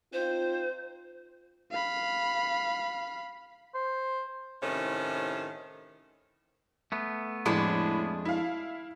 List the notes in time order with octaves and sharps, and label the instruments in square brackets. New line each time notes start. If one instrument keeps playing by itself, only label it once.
[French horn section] C4 D#4 F4 [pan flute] C5
[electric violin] F5 B5
[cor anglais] C5
[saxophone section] A2 C3 D#3 C#4 E4 C5
[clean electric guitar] A3 B3
[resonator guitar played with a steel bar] F2 G#3 D4 [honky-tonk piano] A2
[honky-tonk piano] E4 F5